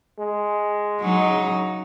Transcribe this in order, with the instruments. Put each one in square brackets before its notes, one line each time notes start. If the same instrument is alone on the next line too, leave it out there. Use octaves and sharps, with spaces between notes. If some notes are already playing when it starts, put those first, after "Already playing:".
[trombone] G#3
[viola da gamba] F#3 D#4
[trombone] C#3